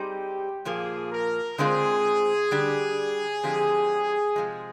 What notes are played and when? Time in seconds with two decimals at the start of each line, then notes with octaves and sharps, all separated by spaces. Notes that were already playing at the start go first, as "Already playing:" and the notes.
Already playing: G3 C4 D#4 G4 G#4 C5
0.65 A#2 F3 A#3 G#4
1.13 A#4
1.58 D3 G#3 C4 F4 G#4 C5
2.51 D3 G3 D4 G4
3.43 D3 F3 G#3 C4 G4
4.36 C3 F3 G#3